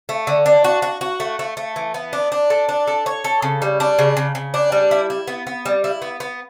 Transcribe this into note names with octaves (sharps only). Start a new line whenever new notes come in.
A3
D3
D4
F#4
F#4
F#4
A3
A3
A3
E3
B3
D4
D4
A4
D4
A4
C#5
A4
C#3
G3
D4
C#3
C#3
C#3
D4
G3
E4
E4
B3
B3
G3
E4
B3
B3